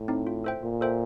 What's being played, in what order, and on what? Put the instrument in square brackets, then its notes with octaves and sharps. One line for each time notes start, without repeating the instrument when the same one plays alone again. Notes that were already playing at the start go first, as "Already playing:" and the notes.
Already playing: [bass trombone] A2
[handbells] C4 D#4
F4
A4 C5 E5 G5
[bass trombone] A#2 [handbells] F4
[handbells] A4 C5 E5 G5